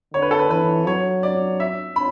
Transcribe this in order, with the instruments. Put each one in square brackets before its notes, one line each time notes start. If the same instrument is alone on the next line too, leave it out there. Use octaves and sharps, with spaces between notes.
[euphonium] D3 [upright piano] C#5
[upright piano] B4
A4
B4
[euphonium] E3 [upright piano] B4
[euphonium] F#3 [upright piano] C#5
[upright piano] D5
E5
B5